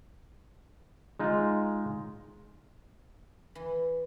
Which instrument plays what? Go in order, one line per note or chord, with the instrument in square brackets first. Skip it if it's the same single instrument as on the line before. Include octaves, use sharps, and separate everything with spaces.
[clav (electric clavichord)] G#3 D#4 F4
[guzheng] E3